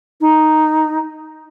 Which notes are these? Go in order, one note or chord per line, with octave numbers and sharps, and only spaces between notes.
D#4